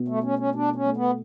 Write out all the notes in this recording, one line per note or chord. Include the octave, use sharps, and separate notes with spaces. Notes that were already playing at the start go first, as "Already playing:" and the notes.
Already playing: B2
A3
A3 C#4
C#4
B2 D4
C#4
A3
B3